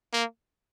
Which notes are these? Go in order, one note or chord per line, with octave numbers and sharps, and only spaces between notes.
A#3